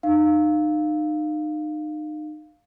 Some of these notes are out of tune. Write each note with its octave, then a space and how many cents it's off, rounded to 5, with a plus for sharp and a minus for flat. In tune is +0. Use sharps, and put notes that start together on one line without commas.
D#4 -35 F5 +0